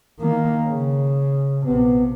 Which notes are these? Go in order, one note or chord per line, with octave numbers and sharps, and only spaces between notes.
D#3 A#3
C#3
A#1 C3 B3